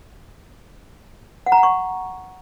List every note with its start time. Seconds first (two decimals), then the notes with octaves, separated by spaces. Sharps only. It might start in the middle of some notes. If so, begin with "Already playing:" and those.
1.46 F#5
1.52 A#5
1.58 F#5
1.63 C#6